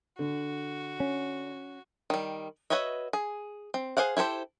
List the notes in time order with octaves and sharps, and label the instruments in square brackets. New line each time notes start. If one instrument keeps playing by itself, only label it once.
[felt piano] D3 [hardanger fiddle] F#4
[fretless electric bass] C#4
[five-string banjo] D#3 G3
F#4 B4 C#5 D#5 E5
G#4
C4
G#4 C5 D5 F5 F#5
E4 G4 A4 C5